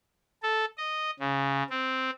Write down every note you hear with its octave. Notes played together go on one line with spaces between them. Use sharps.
A4
D#5
C#3
C4